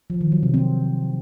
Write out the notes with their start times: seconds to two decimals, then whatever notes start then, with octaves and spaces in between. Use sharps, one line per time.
0.10 F3
0.21 D#3
0.32 F#3
0.43 C3
0.54 C4